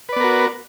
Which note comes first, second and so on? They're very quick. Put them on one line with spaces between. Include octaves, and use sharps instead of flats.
B4 D5 B3 A#4 F#4